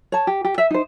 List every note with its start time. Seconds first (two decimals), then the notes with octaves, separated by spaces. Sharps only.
0.12 C#5 A5
0.27 G4
0.45 G4
0.58 E5
0.71 D#4 C5